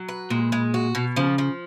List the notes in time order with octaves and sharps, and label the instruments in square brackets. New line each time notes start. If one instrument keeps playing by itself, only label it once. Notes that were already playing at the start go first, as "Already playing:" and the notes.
Already playing: [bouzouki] F#3
B4
[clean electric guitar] A#2 [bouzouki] G#3
[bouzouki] G#3
F#4
B2
[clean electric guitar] C#3 [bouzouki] F3
[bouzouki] F3